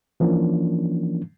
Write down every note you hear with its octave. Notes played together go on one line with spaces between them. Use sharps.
E3 F3 A#3 C#4 D4